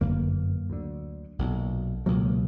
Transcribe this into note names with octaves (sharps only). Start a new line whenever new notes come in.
G1 F#2 D3 F#3 A#3
D2 D3
B1 A#2
C#2 B2 F#3 A#3